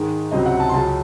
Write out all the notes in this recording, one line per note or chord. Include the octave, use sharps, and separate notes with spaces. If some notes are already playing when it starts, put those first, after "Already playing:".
Already playing: G#2 D#3 G#3
C#2 C3 F#3 D#5
F#5
A5
C6
C#2 C#3 F#3 A5